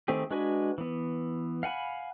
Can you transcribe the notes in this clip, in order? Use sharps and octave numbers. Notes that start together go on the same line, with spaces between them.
D#3 A3 C4 G4 G#4
G#3 D4 F#4 B4 G#5
E3 B3
F5 F#5 G#5 B5